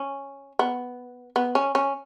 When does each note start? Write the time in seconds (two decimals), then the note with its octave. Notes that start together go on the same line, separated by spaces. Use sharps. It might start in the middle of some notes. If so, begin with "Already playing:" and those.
Already playing: C#4
0.59 B3
1.36 B3
1.55 C#4
1.75 C#4